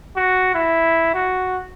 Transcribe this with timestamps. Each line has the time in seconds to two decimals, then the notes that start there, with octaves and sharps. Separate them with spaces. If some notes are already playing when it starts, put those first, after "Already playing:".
0.16 F#4
0.54 E4
1.14 F#4